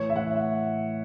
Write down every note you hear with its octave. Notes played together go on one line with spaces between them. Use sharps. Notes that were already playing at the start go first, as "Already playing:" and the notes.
Already playing: A2 E3 C#5
E5
A2 F#5